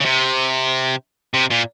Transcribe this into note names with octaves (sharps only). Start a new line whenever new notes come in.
C#3
C3
C3
A#2